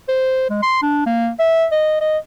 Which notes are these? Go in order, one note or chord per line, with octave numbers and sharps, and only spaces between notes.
C5
G#3
C6
D4
A#3
E5
D#5
D#5